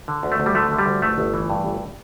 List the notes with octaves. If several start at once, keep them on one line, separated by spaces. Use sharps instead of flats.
D3
D2
A3
D2
G3
D3 A3
D3
G3
D2
G1 A3
G1
E3
G2
G1